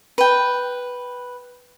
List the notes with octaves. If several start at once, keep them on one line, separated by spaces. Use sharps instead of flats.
B4 G5